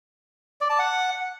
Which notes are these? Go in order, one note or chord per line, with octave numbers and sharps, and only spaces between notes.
D5
A5
F#5